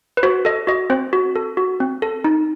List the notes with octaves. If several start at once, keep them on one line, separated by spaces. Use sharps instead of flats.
B4
F#4 C5
A4 D#5
F#4 D#5
C4 C5
F#4
A4
F#4
C4
A4
D#4